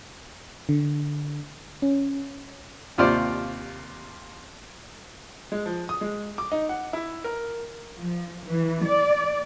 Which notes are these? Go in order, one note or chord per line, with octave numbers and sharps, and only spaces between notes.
D3
C#4
D#2 C3 F4 C5 D5
G#3
F3
D#6
G#3
D6
D#4
F#5
E4
A#4
F3
E3
D5